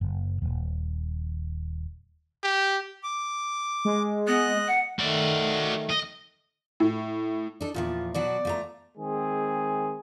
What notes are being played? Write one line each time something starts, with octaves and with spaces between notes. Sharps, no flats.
F#1
D#1
G4
D6
G#3
B3 D#5 F#6
F#5
D#3 A3 F#4 D5
D#5
A2
D4 D#4 A4
E2 A#2 F3 F4
B2 F#3 F#4 D5
F3 A3 A#5
D#3 G#3 C4 G#4